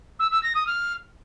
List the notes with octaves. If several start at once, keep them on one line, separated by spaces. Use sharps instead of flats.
E6
E6
A#6
D#6
F6